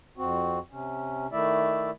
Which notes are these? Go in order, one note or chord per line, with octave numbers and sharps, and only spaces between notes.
F2 C4 F#4
C3 C#4
D#3 A3 E4 D5 E5